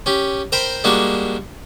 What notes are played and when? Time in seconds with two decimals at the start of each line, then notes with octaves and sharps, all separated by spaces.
0.06 C#4 G4
0.52 A#4 C5 G5 B5 C6
0.84 G3 G#3 A#3 D4 F#4